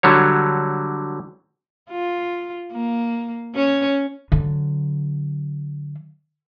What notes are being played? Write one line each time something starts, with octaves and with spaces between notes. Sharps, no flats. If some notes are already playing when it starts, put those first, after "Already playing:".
D3 F#3 G3 C#5
F4
A#3
C#4 C#5
D3 F#3